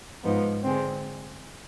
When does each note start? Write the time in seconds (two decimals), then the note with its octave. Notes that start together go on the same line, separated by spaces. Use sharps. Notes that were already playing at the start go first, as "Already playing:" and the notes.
0.24 G#2 F3 B3 D#4
0.63 D3 G#3 C4